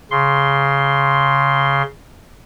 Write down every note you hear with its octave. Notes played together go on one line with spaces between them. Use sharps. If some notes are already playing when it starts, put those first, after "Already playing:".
C#3 C6